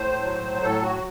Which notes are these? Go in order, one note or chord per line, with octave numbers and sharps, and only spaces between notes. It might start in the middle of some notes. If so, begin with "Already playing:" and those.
Already playing: A2 C5
F#3
A2 A4
F#4